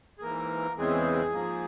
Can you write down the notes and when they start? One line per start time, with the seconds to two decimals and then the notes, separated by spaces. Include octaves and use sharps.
0.18 G#4
0.22 G#2 E3 A#3 A#4
0.78 E2 C#3 E3 G#3 C4 G#4
1.33 G#2 F3 A#3